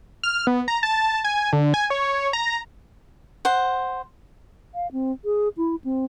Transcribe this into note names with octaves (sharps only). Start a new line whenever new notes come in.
F6
B3
A#5
A5
G#5
D3
G#5
C#5
A#5
C5 F#5
F5
C4
G#4
E4
C4